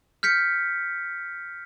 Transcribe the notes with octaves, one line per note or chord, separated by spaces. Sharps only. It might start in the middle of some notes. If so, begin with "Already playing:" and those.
F6 G6 B6 C#7